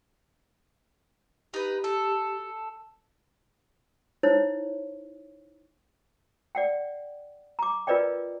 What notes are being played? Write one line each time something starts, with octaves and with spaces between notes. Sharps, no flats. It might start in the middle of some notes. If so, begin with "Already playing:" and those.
D#4 G4 B4
A4
D#4 E4 C5 C#5
D5 F#5 G5
A#5 D6
F4 A#4 B4 D5 D#5 G5